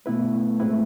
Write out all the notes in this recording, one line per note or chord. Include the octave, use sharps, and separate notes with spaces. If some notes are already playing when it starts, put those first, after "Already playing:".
B2 A3 B3 E4 B4
A2 G#3 C4 E4 B4